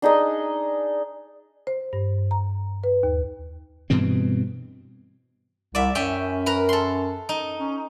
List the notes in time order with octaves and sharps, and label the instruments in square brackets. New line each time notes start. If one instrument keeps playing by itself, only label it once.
[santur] D4 D#4 G#4 D#5
[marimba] C5
G2
A#5
B4
D#2
[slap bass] G2 B2 E3 C4
[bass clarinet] C2 [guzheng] D5 E5
[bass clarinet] F#2 [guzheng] C#4 E5 G5
[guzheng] A#4 B4 A#5
A4 C6
D#4
[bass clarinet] C#4